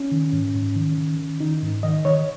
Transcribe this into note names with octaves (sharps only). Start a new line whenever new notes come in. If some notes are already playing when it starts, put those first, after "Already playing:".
Already playing: C#4
D#3
G#2
G#2
D#3
D#3
D#3
D#3 D#4
G#2
D#3 D#5
D#3 C#5